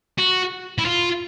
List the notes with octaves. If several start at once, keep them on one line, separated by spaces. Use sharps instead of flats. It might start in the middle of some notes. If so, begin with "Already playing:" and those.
F#4
E4
F4